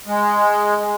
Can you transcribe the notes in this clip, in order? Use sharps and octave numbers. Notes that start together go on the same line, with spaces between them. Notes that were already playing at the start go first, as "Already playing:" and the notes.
G#3